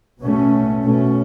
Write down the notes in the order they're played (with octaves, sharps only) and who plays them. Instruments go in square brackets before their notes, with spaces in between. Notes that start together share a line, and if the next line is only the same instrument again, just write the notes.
[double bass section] B2 A3 C#4
B2 A3 C#4